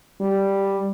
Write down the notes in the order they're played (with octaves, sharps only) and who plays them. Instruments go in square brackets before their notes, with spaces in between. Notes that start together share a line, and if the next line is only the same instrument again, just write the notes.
[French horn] G3